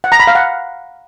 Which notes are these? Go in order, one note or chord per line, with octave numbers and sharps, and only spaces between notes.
F#5
A#5
B5
F5
F#5